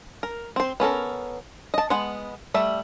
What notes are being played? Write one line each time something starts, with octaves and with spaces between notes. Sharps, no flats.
A#4
C4 C5
B3 C#4 A4 A#4
D#5 A5
G#3 B3 F#5
G3 A3 E5